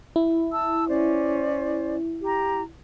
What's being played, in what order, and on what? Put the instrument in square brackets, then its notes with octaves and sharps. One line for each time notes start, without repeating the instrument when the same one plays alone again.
[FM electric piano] E4
[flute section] A5 E6
C#4 C5 D5
G4 A#5